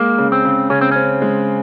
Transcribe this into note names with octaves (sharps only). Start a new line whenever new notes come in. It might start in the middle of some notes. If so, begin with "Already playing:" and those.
Already playing: G#3 A#3
C#3
C4
C#3
C#3 C#4
C4
C4 C#4
G#3